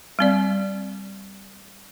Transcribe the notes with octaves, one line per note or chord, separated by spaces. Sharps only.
G3 C4 D5